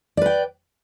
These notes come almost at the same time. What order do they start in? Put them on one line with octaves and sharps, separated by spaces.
D5 B4 G5